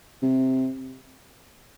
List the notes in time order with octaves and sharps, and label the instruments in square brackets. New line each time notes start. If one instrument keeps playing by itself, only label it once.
[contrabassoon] C3